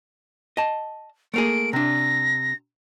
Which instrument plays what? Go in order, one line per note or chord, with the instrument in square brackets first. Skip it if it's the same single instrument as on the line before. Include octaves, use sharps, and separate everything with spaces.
[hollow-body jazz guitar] D#5 A5
[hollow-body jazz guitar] A3 A#3 G#4 [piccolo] D7
[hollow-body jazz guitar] C3 D4 [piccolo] A#6